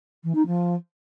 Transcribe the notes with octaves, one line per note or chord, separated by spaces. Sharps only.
E3
D#4
F3